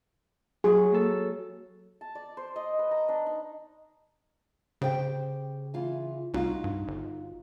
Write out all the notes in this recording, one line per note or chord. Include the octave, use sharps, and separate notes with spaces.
F#3 G#4
A#3 A4
A5
D5
C5
D#5
B4
A#5
D4
D#4
C#3 G4 C5 G5
E3 F4
C2 D#4 F4 F#4
G2
G1